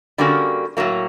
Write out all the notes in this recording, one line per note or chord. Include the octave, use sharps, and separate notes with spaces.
D3 G3 A#3 C#4 F#4
A2 F#3 A#3